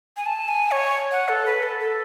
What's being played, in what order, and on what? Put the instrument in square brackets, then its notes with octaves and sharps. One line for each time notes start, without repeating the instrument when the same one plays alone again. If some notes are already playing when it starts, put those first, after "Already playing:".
[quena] G#5
A5
G#5
C#5
F#5
A4
B4
A4
A4